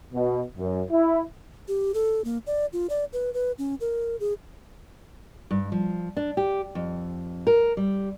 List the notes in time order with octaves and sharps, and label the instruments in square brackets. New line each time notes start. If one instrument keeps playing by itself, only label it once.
[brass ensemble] B2
F#2
E4
[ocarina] G4
A4
A#3
D5
F4
D5
B4
B4
C#4
A#4
G#4
[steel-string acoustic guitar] G2
F3
D4
G4
F2
A#4
G3